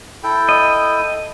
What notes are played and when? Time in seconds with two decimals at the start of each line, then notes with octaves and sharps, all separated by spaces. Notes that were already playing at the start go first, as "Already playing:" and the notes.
0.23 E4 A4 G5
0.49 D#5